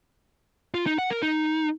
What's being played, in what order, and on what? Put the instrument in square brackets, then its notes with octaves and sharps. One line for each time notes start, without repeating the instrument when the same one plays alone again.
[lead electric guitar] F4
D#4
F#5
A#4
D#4